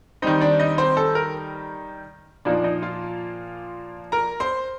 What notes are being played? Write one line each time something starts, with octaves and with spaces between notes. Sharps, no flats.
D#3 G3 C4 D#4 D#5
D4 D5
D#4 D#5
C4 C5
A4
A#4
A#2 F3 A#3 D4 D#4 D5
D#4 D#5
F4 F5
A#4 A#5
C5 C6